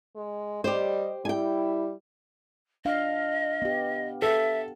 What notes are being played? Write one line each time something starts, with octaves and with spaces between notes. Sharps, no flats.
G#3
G3 G4 C5 D#5
G3 E4 G5 G#5
D4 D#5 F5
B3 G4
A4 E5